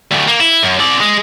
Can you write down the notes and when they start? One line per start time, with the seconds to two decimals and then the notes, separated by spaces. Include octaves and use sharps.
0.12 D2 A2
0.28 A#3
0.40 E4
0.63 F#2
0.80 C4 D5
1.00 G#3